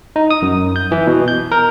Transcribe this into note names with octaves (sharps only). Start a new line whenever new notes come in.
D#4
D#6
F#2
G6
E3
B2
G6
A#4